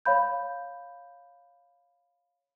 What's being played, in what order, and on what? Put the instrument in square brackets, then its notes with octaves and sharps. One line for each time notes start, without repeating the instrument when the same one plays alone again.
[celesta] C#5 F5 B5 G6